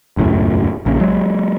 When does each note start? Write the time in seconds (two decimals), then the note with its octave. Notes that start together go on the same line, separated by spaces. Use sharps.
0.17 E1 C#2 F#2 A2
0.86 A#1 C#3
1.01 F#3 G#3